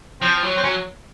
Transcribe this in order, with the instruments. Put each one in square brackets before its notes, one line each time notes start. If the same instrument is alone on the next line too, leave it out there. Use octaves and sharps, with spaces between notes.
[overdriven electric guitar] F3 [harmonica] C4
[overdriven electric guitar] F#3
[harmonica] C4
[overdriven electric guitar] F#3 [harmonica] C#4